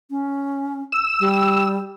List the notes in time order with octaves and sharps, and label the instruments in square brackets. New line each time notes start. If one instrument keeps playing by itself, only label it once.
[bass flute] C#4
[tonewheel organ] E6
[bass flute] G3